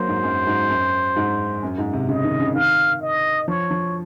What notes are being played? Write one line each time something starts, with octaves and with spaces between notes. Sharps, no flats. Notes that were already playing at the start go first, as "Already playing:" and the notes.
Already playing: F#3 A#3 C5
G#2
F#2
G#2
F#2
G#2
F#2
G#2
C3
C#3 D#5
D#3
C#3
D#3 F5
D#5
F3 C#5
F3